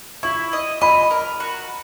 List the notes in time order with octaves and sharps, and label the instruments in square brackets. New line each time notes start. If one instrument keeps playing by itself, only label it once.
[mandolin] E4 [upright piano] C#6
[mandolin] D#5
[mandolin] D#5 [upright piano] B5
[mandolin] A#4
F#4